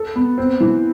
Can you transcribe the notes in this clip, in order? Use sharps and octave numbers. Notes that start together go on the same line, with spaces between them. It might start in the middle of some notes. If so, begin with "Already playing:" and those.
Already playing: A4
B3
C4
E3